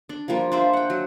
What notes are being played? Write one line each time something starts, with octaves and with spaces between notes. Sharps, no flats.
D4
F3 G3 A#3 F4
D4 C5 E5
F#5 G5
F#3